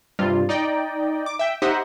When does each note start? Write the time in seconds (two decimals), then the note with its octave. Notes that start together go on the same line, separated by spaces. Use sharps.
0.19 G2 C3 G3 F4
0.49 D#4 D5 D#5 G5
1.26 D6
1.39 E5 G5
1.62 D#4 G4 C5 D#5 E5 F#5